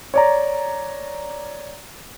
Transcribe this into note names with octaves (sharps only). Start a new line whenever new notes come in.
C#5 D5 A#5